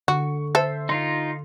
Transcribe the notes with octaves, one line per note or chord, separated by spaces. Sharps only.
D3 F#4 C#6
A4 C5 E5
D#4 F4 C6